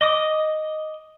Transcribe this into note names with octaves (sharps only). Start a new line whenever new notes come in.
D#5 D6 D#6